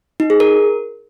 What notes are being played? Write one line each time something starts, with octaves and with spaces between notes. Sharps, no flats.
D#4
G#4
A#4